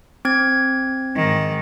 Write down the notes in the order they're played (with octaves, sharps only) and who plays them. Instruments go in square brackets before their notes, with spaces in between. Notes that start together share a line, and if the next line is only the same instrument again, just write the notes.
[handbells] C4 G#6
[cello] G#2 D#3